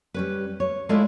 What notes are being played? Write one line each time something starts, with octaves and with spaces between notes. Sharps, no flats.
G3 C#4 B4
C#5
G#3 A3 E4 F4 D5 F5